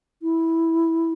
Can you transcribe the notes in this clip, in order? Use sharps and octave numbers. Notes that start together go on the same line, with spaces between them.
E4